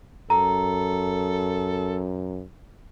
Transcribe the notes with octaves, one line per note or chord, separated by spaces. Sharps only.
F#2 A4 A#5